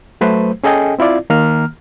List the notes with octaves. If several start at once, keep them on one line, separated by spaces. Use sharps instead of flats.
F#3 A3 B4 C5
C#4 G#4 A4 D#5 G5 G#5
C4 E4 F4 D5
D#3 A#3 A#5 F6